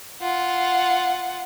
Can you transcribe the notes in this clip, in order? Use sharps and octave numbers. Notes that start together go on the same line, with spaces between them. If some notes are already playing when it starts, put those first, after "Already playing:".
F4 F#5